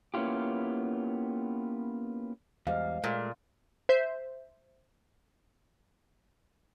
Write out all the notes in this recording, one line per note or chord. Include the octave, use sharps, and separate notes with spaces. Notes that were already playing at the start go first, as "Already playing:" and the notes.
A#3 B3 C#4 E4 F4 G4
E2 G#2 G3 F5
A#2 G#3 A3
C5 E5 G6